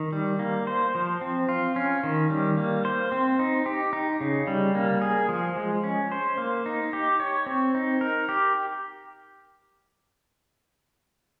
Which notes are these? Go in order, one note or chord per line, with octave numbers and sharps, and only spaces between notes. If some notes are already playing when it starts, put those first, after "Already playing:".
Already playing: D#3
G3
A#3
C5
F3
C4
F4
C#4
D#3
G3
A#3
C5
C4
D#4
G4
D#4
C#3
G3
A#3
G#4
F3
G#3
C#4
C5
A#3
D#4
G4
C#5
C4
D#4
A#4
G4